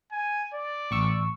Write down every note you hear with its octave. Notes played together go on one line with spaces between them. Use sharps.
G#5
D5
A1 C#6 E6